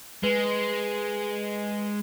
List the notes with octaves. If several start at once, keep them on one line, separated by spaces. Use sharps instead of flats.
G#3 B4